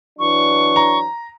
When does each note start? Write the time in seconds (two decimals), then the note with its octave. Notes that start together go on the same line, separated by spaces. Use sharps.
0.19 E3 F#3 D4 C#6
0.76 A#5